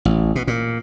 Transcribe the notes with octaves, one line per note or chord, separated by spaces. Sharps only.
A1
B2
A#2